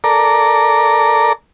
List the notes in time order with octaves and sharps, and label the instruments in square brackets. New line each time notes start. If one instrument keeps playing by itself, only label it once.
[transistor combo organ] A4 A#4 D5 A#5